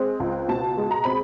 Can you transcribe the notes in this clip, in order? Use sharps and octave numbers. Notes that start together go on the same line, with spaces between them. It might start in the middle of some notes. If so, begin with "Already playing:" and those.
Already playing: G#3 C4
C#2
B2 A5
G#3
A#5
C4 B5